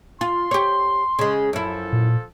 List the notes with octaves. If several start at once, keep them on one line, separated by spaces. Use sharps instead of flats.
F4 C6
G4 C#5
C#3 G#3
F#2 F3 E4 A4
A#2